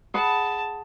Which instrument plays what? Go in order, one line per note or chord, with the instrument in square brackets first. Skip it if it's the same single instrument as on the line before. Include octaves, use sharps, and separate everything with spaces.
[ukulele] G#4 F#5 B5 [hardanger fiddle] A5